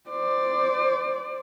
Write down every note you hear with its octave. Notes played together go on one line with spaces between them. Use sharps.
C5 D5